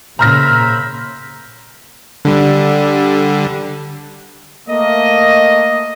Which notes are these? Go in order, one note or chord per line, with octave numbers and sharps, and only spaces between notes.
A#2 C#3 C5 E5 A#5 B5 F6 A#6
D3 G3
A3 A#3 D#5